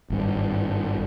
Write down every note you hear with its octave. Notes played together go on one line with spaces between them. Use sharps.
G#1 G2